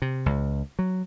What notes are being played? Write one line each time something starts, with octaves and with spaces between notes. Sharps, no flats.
C3
C#2
F#3